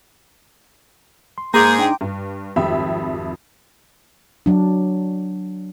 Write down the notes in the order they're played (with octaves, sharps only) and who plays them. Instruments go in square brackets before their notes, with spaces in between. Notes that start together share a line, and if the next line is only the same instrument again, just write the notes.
[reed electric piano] C6
[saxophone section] G#2 G#4 [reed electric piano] A#3 [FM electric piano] A#5 C6 D6 [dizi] G6
[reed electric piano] D4 D#4 [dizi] G5
[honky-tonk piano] G2
G#1 F2 G3 G4 E5 B5
[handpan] F#3 D4